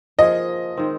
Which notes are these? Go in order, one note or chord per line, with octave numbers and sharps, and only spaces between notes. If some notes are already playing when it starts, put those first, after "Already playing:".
F3 A#3 F4 G#4 D#5
D#3 G#3 C4 D#4